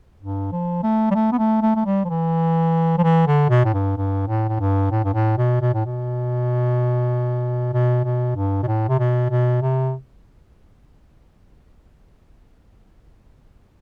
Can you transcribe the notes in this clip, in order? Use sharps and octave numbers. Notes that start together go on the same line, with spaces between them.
G2
F3
A3
G3
A3
B3
A3
A3
A3
G3
F3
E3
F3
E3
D3
B2
A2
G2
G2
A2
A2
G2
A2
G2
A2
B2
B2
A2
B2
B2
B2
G2
B2
A2
C3
B2
B2
C3